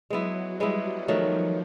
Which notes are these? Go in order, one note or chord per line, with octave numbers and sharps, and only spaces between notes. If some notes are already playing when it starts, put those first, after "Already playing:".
F#3 G#3 B3 E4
G3 G#3 B3 E4
D#3 F3 F#3 A3